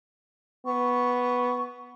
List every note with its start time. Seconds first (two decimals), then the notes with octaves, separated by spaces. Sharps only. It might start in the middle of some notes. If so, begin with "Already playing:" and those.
0.66 B3 C#6